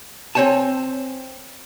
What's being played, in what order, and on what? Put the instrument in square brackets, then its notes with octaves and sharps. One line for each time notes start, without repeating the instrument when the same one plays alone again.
[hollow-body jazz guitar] C4 C5 C#5 G#5 A5